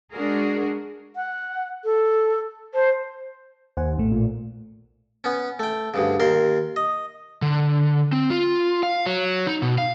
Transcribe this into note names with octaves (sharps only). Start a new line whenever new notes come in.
G#3 D4 F#4 G#4 A#4
F#5
A4
C5 A5
D#2 C5 F#5 G#5
A#1 A2 A3
A#2
B3 C#4
A3 G5
D2 G2 C#3
D#2 A#4 C6
D#5
D3
C4
F4
F5
F#3
D#4
B2
F5